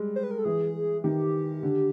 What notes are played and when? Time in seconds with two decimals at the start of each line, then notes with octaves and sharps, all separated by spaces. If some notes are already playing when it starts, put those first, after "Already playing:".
Already playing: G3 G#3
0.16 C5
0.24 B4
0.31 A#4
0.38 A4
0.45 E3 G#4
1.04 D#3 G4
1.63 D3